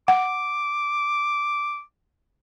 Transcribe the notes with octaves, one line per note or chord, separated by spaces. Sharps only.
F#5 D6